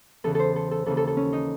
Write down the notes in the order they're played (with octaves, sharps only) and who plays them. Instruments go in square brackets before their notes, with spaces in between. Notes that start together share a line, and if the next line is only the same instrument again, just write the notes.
[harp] E2 C#3 E3 A4
A4 C5
A4
A4
D#2 C#3 E3 A4
A4
A4
C#4
D#4